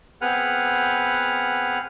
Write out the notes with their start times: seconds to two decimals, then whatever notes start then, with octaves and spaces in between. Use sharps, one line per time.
0.21 B3 C4 G#4 B4 F#5 F6